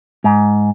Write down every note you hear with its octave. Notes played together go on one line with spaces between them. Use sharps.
G#2